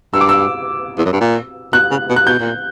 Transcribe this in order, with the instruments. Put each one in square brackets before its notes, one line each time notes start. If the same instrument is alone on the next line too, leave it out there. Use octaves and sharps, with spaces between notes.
[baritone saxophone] G2 [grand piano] E6
[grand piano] D6
E6
[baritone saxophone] E2
F#2
G2
A#2
[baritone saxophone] B2 [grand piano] F#6
[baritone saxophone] C#3
B2
[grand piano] F#6
[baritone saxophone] B2 [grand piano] G6
[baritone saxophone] A#2